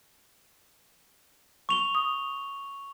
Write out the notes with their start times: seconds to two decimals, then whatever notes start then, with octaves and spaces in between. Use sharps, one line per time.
1.69 C#6 F7 G7
1.95 D#6